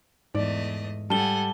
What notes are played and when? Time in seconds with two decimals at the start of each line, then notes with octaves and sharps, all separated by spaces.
0.35 E2 G#2 A3 D5 D#5
1.10 G3 A4 F#5 G#5 A5 G7